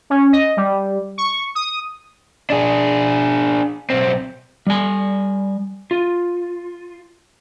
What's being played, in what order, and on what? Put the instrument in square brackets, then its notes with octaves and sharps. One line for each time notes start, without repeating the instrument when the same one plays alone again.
[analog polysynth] C#4
D#5
G3
C#6
D#6
[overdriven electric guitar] D4 G#4
B1 C4
[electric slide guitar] G3 G#5
F4